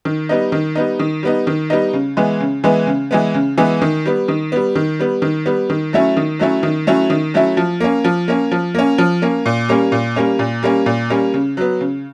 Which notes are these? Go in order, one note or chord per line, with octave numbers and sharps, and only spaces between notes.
D#3
G3 B3 D#4
D#3
G3 B3 D#4
D#3
G3 B3 D#4
D#3
G3 B3 D#4
C#3
E3 G#3 B3
C#3
E3 G#3 B3
C#3
E3 G#3 B3
C#3
E3 G#3 B3
D#3
G3 B3
D#3
G3 B3
D#3
G3 B3
D#3
G3 B3
D#3
F#3 A3 C#4 E4
D#3
F#3 A3 C#4 E4
D#3
F#3 A3 C#4 E4
D#3
F#3 A3 C#4 E4
F3
A#3 C#4
F3
A#3 C#4
F3
A#3 C#4
F3
A#3 C#4
A#2
G3 A#3 C#4
A#2
G3 A#3 C#4
A#2
G3 A#3 C#4
A#2
G3 A#3 C#4
C#3
F#3 B3
C#3